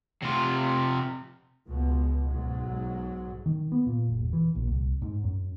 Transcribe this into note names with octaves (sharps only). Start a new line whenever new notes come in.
C3 F4
C#2 B2
B1 G#2 F#3
D#3
B3
A#2
F#1
E1
E3
A#1
C2
G#2
F#2